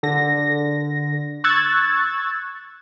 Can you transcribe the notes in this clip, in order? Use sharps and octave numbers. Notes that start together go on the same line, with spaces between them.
D3 A#6
C#6 E6 F#6 G#6 A6